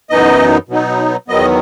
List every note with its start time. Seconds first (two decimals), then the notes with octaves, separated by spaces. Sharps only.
0.10 F#2 E3 B3 D#4 D#5
0.69 B2 F#3 B3 D#4
1.28 E2 D#3 F#3 B3 D#5